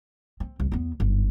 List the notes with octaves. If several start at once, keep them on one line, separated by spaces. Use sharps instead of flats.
C4
C2
E2 B3
G1 G#2